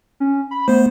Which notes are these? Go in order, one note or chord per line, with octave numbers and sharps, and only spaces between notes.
C#4
B5
A3 B3 C5